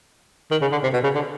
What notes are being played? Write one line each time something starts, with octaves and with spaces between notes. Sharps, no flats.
D#3
C#3
D3
C3
B2
C#3
D3